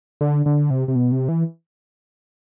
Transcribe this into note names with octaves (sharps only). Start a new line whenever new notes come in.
D3
D3
C3
C3
B2
C3
E3